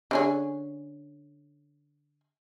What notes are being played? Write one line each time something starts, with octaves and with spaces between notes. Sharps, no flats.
D3 C#4 G#4